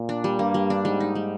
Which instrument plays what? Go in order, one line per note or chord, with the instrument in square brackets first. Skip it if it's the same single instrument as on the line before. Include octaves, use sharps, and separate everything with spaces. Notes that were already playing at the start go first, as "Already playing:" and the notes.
Already playing: [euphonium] A#2
[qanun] D4
G3
[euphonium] G2 [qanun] A#3
[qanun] G3
D4
[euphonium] G#2 [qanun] G3
[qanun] D#4
G3